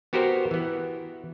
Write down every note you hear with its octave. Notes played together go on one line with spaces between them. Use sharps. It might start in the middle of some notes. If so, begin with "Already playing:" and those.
B3 F#4 G4 A#4 C5
E3 B3